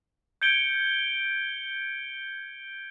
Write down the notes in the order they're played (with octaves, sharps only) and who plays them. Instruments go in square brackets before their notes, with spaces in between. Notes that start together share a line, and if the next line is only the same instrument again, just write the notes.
[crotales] G6 G#6 C#7 D7 G7